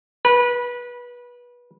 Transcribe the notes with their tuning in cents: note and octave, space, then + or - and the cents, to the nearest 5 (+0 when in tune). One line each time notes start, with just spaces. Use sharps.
B4 -25